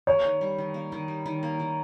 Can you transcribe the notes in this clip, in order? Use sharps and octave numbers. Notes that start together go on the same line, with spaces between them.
A#3 C#5
D#3
G3
D#3
A#3
D#3
G3
D#3
A#3
D#3